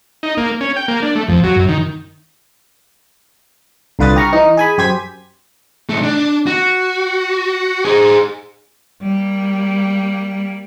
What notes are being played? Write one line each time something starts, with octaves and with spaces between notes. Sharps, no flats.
D#4
A#3
C#4
G5
A#3
D4
A3
F2
F#3
F#2
D#3
C2 D3 F4 B4 D#6 A6
G4 A#5 C#6 F6
E3 D#4
G#4 G#5 B5
F#2 G4 C5 G#5 G#6 B6
B1 A3
D4
F#4
G#4 C5
G3 A#3